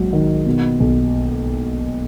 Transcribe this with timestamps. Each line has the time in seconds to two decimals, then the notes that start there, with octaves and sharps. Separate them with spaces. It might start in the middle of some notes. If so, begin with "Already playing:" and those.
Already playing: A#1 G#2 F#3
0.13 D#3
0.46 B2
0.80 B1